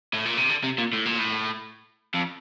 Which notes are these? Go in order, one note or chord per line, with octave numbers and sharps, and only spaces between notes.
A2
A#2
C3
D3
C3
A#2
A2
A#2
A2
F2